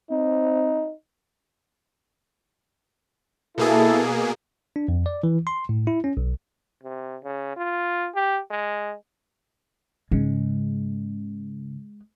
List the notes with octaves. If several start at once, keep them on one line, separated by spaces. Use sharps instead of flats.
C4 D#4
B2 A#3 E4 G#4 A4
D4
F2
D5
E3
C6
A2
E4
C#4
B1
C3
C#3
F4
G4
G#3
G#2 C#3 G#3